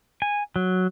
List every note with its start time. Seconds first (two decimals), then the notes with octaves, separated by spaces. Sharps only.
0.22 G#5
0.56 F#3